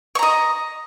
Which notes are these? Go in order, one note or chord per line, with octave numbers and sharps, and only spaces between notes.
D#5 A#5 C#6